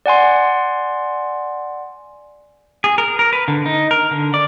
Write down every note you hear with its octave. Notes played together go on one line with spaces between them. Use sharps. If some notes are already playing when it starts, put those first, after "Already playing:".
D5 F#5 G#5 C6
G#4
A#4
A#4
B4
D3
D#4
A#4
D3
D5